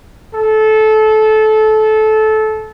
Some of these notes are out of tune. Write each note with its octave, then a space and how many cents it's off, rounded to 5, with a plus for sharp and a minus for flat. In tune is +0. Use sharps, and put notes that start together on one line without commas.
A4 -20